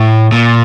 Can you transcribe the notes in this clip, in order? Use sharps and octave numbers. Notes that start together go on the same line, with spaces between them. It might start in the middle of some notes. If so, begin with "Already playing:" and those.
Already playing: A2
A#2